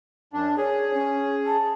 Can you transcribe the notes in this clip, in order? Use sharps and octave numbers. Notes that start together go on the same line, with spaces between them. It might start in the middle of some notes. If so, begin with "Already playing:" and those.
F#2 D4
G#4 C#5
C#4
A5